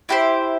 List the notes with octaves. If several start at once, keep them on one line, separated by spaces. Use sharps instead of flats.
E4 G4 C5